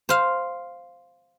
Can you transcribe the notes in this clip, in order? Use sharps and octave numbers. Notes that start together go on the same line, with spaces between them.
C5 F5